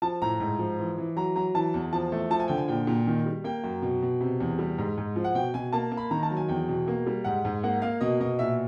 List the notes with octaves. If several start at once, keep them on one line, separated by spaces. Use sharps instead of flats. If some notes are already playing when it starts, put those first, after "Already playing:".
F3 A5
A2 A#5
G#2
F3
E3
E3
F#3 A#5
F#3 A#5
E3 A5
E2
F3 A5
A3
F3 A5
G#5
D3 G5
G#5
A#2 G5
A#2
D#3
G3
A#3 G5
F#2
B2
B2
C3
E2
G3
G#2
G#2
F3
F#5
B2 G5
B2 G#5
A#3 A5
A#3
B5
D#3 A#5
A5
F#3
G#5
E2 G5
B2
A#3
G3
G#2 F#5
G#2
A#3 F#5
A#3 F5
B2 D#5
B2 D#5
A#2 E5